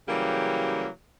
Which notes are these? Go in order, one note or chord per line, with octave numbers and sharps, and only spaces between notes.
C#3 E3 F#3 G3 A#3 G4